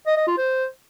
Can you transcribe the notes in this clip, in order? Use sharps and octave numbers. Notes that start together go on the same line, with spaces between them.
D#5
D#5
F4
C5